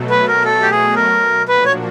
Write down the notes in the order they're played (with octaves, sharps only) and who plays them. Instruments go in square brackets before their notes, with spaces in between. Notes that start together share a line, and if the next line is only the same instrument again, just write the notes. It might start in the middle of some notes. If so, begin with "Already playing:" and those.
Already playing: [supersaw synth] B2 F#3 A3
[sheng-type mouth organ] B4
A#4
A4
G4
G#4
A#4
[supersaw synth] A#2 F3 A#3 D4 F#4 [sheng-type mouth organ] B4
[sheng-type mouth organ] C#5